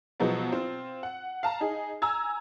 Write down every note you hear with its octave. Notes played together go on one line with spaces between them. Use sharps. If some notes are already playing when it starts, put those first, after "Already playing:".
B2 F3 F#3 G#3 B3
C4 F4
F#5
F5 A5 A#5
D#4 G#4
G#5 A#5 E6 G#6